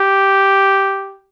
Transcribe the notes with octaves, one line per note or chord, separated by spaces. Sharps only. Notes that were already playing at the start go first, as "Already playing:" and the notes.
Already playing: G4